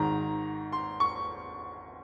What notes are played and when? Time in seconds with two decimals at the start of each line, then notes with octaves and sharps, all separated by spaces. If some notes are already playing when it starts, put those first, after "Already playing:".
Already playing: G#1 G#2 D#3 A#5
0.72 C6
1.00 C#6